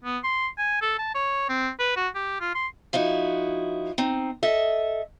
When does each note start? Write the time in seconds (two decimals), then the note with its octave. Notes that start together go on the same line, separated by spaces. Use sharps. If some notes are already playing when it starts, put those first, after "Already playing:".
0.04 B3
0.24 C6
0.58 G#5
0.82 A4
0.98 A5
1.15 C#5
1.49 C4
1.80 B4
1.96 F#4
2.15 G4
2.41 F4
2.55 C6
2.93 F3 D#4 E4 F#4
3.98 C4 D#4
4.43 A4 D#5 E5